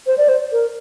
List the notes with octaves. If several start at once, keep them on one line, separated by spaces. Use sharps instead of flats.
C5
D5
C5
A#4